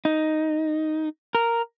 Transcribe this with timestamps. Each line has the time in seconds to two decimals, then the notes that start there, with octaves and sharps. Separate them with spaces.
0.05 D#4
1.35 A#4